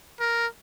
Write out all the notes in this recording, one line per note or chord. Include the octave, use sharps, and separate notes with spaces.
A#4